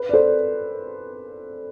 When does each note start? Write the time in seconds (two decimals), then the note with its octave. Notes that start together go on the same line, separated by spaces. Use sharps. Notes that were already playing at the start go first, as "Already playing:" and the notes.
Already playing: B4
0.09 D5
0.13 A4 C5